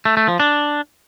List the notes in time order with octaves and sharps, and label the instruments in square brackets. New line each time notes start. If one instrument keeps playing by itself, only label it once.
[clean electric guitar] A3
A3
F3
D4